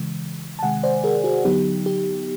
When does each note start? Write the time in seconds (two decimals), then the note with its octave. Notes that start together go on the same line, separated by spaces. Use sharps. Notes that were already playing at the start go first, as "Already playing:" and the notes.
Already playing: C#3 E3 G#3
0.59 A5
0.63 C3 D#3 G#3 F#5 G#5
0.83 C5 D5
1.04 G#4 A#4
1.24 F#4 G#4
1.45 D3 F#3 B3 D#4 G4
1.86 G4